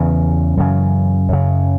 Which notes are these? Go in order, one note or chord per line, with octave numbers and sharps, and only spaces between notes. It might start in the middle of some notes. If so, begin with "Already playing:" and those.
Already playing: E2 C#3 E3
F#2 C#3
F#2 C#3